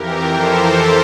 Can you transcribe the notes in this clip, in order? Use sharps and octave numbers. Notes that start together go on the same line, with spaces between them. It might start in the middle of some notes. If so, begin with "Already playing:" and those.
Already playing: F2 E3 G4 A#4
A4 C5